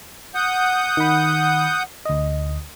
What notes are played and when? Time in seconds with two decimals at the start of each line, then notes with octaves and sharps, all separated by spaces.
0.35 F#5 D#6 G6
0.97 D#3 B5
2.05 D2 D#5